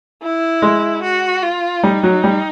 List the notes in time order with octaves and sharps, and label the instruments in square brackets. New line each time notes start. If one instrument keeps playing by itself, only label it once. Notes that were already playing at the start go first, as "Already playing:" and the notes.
[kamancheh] E4
[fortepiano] G#3
[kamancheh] F#4
F4
[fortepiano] G3 [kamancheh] D#4
[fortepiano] F#3
G3